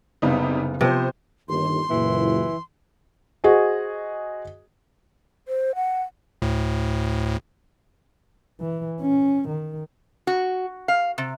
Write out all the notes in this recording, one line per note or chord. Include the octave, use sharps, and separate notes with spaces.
F#1 C3 G3 B3 D#4 F5
C3 F3 B3 C5
G1 D#2 C6
F#1 A#2 E3
F#4 G#4 C5 D#5 F#5 G#5
C5
F#5
D2 A2
E3
C#4
D#3
F#4
F5
C3